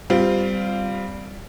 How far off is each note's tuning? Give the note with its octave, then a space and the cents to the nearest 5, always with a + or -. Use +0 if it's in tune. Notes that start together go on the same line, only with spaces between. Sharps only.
G3 +0 C4 -20 F4 +0